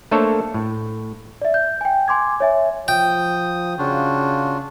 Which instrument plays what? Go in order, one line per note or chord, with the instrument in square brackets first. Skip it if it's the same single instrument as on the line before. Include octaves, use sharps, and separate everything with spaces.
[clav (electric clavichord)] A3 A#3 D4 A4 C5 C#5
A2
[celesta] D5 E5
G6
G5 G#5
G#5 C6 D6 G#6
C#5 E5 G#5
[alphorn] F3 [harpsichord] G5 [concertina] D#6
[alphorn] C#3 [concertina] D4 F4 F#4